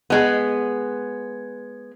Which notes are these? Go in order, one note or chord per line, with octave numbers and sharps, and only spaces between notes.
G#3 B3